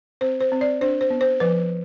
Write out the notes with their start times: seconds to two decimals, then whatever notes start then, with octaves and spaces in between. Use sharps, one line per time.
0.21 C4 C5
0.41 C5
0.52 C4
0.61 D5
0.81 D4 C5
1.01 C5
1.10 B3
1.21 C5
1.40 F3 B4